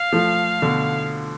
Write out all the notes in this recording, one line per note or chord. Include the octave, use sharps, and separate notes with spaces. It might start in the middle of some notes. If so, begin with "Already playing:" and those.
Already playing: F5
F3 A3
B2 D3